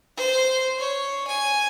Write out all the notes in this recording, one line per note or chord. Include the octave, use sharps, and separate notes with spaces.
C5
C#5
G#5